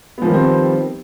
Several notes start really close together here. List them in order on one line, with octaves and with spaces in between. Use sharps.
B3 F3 D#3 G3 C4